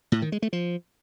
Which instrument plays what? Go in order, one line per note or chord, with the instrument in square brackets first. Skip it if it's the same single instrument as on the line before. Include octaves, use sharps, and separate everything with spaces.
[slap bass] A2
D#3
G#3
A3
F3